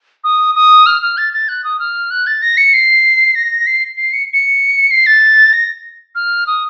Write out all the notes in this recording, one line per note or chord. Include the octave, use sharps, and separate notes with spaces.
D#6
D#6
F6
F6
A6
A6
F#6
D#6
F6
F#6
A6
A#6
C#7
C7
A#6
C7
C7
C#7
C#7
C7
A6
A#6
F6
D#6